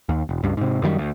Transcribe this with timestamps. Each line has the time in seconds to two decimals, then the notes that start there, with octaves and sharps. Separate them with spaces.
0.09 D#2
0.29 E1
0.44 C#2 G2
0.57 G#2 C3
0.82 F#2 D#3 F3 G3
0.98 D2